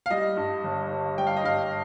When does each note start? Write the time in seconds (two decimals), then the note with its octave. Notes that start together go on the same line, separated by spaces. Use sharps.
0.06 F5
0.10 G3 D#5
0.37 G2
0.64 G1
0.91 G1
1.18 G3 G5
1.27 F5
1.37 D#5
1.44 G2 F5